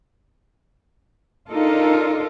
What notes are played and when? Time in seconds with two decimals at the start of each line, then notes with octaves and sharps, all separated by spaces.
1.50 D4 D#4 F4 A4 A#4